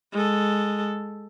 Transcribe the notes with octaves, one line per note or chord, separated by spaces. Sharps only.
G#3 A4